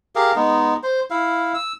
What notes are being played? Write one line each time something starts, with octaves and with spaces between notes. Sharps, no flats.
G4 G#4 A#4 F5
G#3 B3 D#4
C5
E4 F5
E6